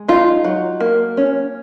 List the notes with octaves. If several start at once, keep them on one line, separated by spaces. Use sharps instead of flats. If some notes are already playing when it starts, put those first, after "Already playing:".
Already playing: G#3
D#4 F4
F#3
A#3
C#4